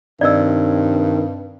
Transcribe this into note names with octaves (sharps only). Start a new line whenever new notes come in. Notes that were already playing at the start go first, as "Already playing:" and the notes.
G2 C3 D#3 D5 D#5 E6